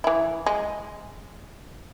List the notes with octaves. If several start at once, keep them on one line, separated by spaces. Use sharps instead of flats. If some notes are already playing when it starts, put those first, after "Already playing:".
E3 E4
G#3